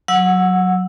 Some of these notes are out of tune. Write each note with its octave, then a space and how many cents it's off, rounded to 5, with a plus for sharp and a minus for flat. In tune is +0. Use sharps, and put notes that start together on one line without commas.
F#3 +0 F#5 -15 E6 +0